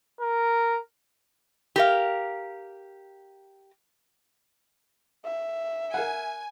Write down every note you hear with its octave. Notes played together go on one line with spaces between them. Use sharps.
A#4
G4 A#4 F5
E5
A#4 F5 F#5 G#5